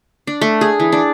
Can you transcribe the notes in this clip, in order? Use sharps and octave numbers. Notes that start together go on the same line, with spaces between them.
D4
A3
G#4
E3
D4